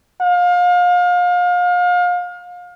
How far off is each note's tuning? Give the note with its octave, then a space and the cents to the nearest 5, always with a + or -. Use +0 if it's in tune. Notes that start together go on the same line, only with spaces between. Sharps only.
F5 +35